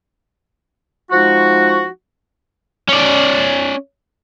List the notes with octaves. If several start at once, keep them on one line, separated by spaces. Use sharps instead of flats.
F3 G#3 D#4 F#4
C#4 D5